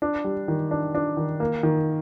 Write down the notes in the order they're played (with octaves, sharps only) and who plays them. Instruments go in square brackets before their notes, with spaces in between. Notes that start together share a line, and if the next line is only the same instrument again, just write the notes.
[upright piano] D4
G3
D#3
D4
D4
D#3
A#3
D#3